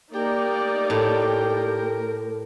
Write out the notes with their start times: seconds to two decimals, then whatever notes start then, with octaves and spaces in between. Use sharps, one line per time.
0.15 A#3 D#4 G4 A#4 D5
0.90 A2